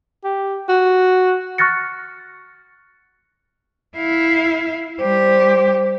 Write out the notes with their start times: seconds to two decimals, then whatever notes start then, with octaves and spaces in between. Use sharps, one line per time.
0.24 G4
0.69 F#4
1.58 C#6 F6 F#6 A6 A#6 C#7
3.97 E4 F5
5.00 G3 G4 C5